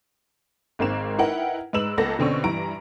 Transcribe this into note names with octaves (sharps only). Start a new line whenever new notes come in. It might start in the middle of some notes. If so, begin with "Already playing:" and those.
G#1 G#2 A#3 C4 E7
D#4 E4 A#4 B4 F#5 G5
G#2 G#3 B4 E6 E7 F#7
C#2 A#3 B3 A4 A#6
B2 D3 C4 C#4 C#6
G2 E3 A#5 D7